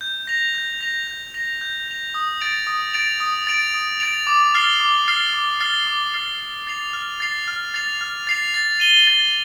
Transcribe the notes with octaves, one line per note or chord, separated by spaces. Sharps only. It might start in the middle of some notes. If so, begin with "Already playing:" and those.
G6
A#6 F7
G6
A#6 F7
G6
A#6 F7
G6
A#6 F7
D#6
A6 D7 F7
D#6
A6 D7 F7
D#6
A6 D7 F7
D#6
A6 D7 F7
D6
F6 A6 C7 G7
D6
F6 A6 C7 G7
D6
F6 A6 C7 G7
D6
F6 A6 C7 G7
F6
A6 C7 F7
F6
A6 C7 F7
F6
A6 C7 F7
F6
A6 C7 F7
A6
D#7 G7
A6